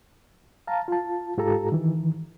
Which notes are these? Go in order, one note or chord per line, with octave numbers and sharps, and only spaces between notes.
F5 A5 A#5
F4 A5
G#2 F4 G4 A4 A#5
D#3 E3